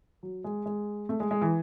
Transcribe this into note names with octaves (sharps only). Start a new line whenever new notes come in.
F#3
G#3
G#3
A3
G#3
G#3
E3